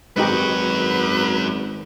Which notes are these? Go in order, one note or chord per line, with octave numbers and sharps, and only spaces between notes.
G#1 F#2 G#3 D#4 F#4 G4 B4